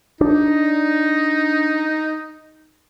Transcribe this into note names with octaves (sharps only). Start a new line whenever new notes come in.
D4 D#4